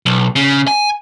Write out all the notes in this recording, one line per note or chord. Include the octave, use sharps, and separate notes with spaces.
B1
C#3
G#5